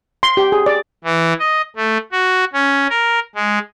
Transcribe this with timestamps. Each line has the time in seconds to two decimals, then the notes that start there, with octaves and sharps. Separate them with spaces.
0.23 C6
0.37 G4
0.52 G#4
0.66 D5
1.04 E3
1.40 D#5
1.76 A3
2.12 F#4
2.53 C#4
2.89 A#4
3.35 G#3